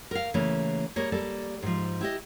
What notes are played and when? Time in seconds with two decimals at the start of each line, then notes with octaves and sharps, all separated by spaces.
0.11 A#4 F5
0.34 C#3 E3 A3 A#3
0.96 G3 A#3 G#4 C#5
1.12 G3 A#3 A4 D5
1.62 G#2 F3
2.01 E4 G4 D#5